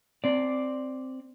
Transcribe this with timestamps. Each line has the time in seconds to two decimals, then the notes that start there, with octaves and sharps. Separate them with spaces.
0.24 C4 D5